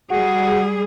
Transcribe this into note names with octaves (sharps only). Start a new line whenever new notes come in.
G3 F#4 G#4